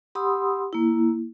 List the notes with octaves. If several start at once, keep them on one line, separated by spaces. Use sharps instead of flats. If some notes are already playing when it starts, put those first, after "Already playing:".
G4 F#5 B5 C6 D#6 E6
A#3 E4